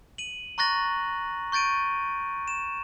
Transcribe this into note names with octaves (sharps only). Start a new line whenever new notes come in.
D#7 F#7
A#5 C#6 F#6 A6 A#6 F#7
C#6 G6 A6 D7 D#7
E7